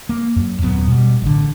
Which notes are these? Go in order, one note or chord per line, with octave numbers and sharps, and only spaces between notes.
A#3
F#2
D#1 F#2 B3
B2 G3
A1 D3